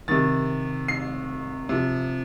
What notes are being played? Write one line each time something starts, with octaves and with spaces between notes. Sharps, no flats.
C3 D#3 A6
C7
C3 F3